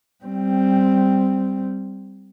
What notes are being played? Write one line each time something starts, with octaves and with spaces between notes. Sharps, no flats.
G3 C4